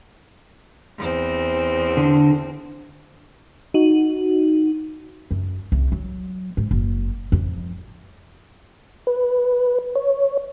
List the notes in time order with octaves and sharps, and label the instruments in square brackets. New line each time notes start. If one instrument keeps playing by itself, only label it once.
[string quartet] E2 C4
[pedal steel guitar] D3
[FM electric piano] D#4 F#4
[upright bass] F#2
C2
F#3
G#2
F#1
F2
[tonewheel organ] B4
C#5